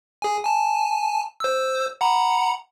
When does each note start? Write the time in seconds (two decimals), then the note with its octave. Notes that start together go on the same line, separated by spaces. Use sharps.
0.22 G#4 G#5
0.43 G#5 A5
1.40 C5 E6
2.01 F#5 A#5 B5